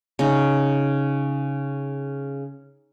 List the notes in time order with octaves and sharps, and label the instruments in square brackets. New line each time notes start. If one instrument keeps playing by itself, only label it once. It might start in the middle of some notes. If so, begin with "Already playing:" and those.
[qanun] C#3 D#4